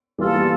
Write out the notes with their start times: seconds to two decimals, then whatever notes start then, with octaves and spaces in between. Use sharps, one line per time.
0.19 E3 G3 A#3 F4 A4
0.35 G3